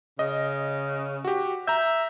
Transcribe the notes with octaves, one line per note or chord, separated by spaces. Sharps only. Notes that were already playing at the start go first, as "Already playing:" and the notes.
C#3 D#5
F#4 G4
E5 A#5 G6